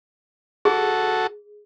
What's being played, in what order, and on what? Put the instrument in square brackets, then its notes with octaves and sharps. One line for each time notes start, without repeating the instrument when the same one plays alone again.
[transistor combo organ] F#4 A4 [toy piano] G#4